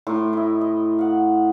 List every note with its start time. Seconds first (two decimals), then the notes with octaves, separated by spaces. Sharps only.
0.07 A2 A#4 C6
0.33 E4 D#5
0.61 D#5
0.99 F5 F#5